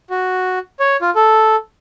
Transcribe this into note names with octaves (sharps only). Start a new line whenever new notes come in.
F#4
C#5
F4
A4